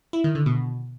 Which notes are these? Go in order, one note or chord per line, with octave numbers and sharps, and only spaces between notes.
E4
D#3
D3
B2